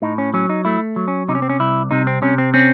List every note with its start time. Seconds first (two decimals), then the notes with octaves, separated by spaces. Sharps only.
0.02 A2 D#4
0.18 C#4
0.34 F#3 C#4
0.50 D#4
0.65 A3 E4
0.96 F#3
1.08 C#4
1.28 C3 D#4
1.35 C#4
1.42 C4
1.49 C#4
1.60 C2 E4
1.91 C3 D#4
2.07 C4
2.22 C3 C#4
2.38 C4
2.54 C4 C#4